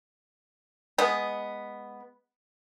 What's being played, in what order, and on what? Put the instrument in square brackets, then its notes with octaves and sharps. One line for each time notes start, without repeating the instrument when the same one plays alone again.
[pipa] G#3 B3